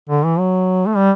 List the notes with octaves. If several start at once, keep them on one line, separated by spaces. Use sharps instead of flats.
D3
E3
F#3
A3
G3